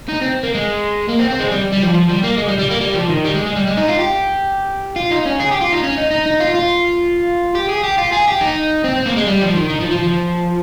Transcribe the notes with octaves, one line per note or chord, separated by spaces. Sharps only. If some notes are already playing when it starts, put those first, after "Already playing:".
D#4
C4
A#3
G#3
A#3
C4
C4
G#3
G3
G3
F3
F3
G3
A#3
G#3
G3
G3
A#3
G3
F3
D#3
G3
G#3
G#3
G3
G#3
D#4
F4
G4
F4
D#4
C#4
G#4
G4
F4
D#4
C#4
D#4
D#4
D#4
F4
F4
G4
G#4
G4
F4
G#4
G4
D#4
C4
C4
A#3
G#3
G3
F3
D#3
D#3
F3
F3
F3